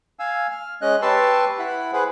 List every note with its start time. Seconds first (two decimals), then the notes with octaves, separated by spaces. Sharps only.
0.19 F5 G#5 E6
0.50 F6
0.82 G#3 C#4 D#5 F#6
1.02 G4 B4 A5 C6 C#6 E6
1.59 E4 F#5 B5
1.93 G#4 B4 C5 F#5